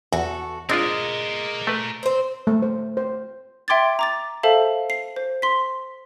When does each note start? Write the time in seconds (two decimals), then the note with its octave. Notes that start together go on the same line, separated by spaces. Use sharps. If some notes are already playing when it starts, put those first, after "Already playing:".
0.12 E2 F#4 A4
0.69 G#3 C4 D4 F4 A#4 D5
1.67 A3 B4
2.03 C4 C5
2.47 A3
2.62 C5
2.97 C5
3.68 E5 G5 C6 D6 G#6 A6
3.99 A#5 D6 A6
4.43 A4 C5 E5 F5 A5
4.90 C7
5.16 C5
5.42 C6 B6